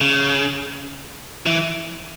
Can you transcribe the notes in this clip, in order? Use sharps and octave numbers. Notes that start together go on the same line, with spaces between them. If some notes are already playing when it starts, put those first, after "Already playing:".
C#3
E3